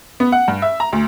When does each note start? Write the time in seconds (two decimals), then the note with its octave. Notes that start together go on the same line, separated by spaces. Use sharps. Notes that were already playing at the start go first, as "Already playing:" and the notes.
0.20 B3
0.32 F#5
0.48 G2
0.62 E5
0.80 A#5
0.93 D2